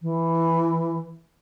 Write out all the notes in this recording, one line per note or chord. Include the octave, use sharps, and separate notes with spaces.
E3